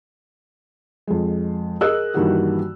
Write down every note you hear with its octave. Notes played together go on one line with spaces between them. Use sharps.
F2 G#3
G#4 A#4 D#5 E6 F#6
G2 D#3 E3 A#3 F#4 G4